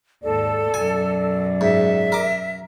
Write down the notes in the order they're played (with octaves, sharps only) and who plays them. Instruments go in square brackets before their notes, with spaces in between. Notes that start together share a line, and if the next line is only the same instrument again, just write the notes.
[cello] D#2 G#2 [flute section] A4 [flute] D5
[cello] F#2 B2 [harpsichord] G#5
[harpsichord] G#2 [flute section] E5
[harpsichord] A#4 D6